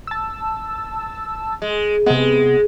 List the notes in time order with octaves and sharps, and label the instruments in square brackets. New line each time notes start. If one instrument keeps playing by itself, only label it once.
[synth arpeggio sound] A5 E6
[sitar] G#3
[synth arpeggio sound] C3 B3 [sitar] G#3